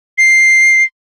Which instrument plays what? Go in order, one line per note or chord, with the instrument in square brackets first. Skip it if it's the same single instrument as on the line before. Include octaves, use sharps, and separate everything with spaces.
[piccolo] C7